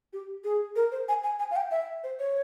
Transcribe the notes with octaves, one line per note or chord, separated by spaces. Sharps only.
G4
G#4
A#4
C5
G#5
G#5
G#5
F5
G5
E5
C5
C#5